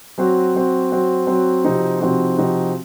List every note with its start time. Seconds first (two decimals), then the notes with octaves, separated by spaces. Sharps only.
0.18 F#3 C4 F#4
0.55 F#3 C4 F#4
0.91 F#3 C4 F#4
1.27 F#3 C4 F#4
1.64 C3 F3 C4 D#4 F#4
2.00 C3 F3 C4 D#4 F#4
2.37 C3 F3 C4 D#4 F#4